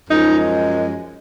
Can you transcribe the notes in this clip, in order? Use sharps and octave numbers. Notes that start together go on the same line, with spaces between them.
F#2 F3 G#3 D#4